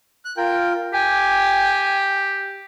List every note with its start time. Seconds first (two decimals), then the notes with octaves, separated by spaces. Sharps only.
0.25 F#6
0.37 F4 A#4 G5
0.93 G4 G5 G#5